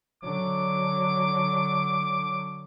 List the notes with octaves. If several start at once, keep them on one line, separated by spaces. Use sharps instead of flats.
D3 F#3 D6